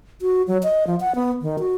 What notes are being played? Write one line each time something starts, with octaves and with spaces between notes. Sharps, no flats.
F#4
F#3
D#5
F3
F#5
B3
D#3
F#4